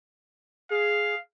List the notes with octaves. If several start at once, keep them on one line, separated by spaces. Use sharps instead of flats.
G#4 F5